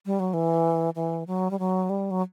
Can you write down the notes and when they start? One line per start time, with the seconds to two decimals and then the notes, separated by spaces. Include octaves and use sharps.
0.06 G3
0.20 F#3
0.34 E3
0.95 E3
1.27 F#3
1.51 G3
1.59 F#3
1.90 G3
2.11 F#3